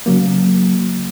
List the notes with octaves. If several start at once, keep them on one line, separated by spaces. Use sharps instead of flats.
C#3 F#3 A#3